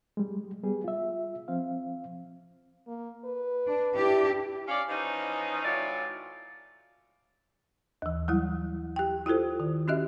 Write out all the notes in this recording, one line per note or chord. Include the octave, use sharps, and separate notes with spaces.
G3 G#3
G3 B3 G#4
F4 E5
F3 C4 F5
A#3
B4
D4
D4 E4 G4
C#4 D5 F5
E3 F3 C#4 D#4
A2 E3 F#3 F4 C#5 D5
D#2 E3
F#3 G3 E4
G4 G5
E4 F4 G4 A4 C5
D#3
C#4 F#4 G4 D#5 E5